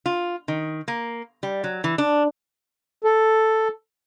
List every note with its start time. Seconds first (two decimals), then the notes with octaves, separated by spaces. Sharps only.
0.06 F4
0.48 D#3
0.88 A#3
1.43 G3
1.64 F#3
1.84 E3
1.98 D4
3.04 A4